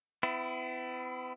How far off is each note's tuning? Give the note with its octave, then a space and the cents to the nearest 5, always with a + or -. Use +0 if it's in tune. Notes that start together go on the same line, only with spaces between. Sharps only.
B3 +45 E4 +15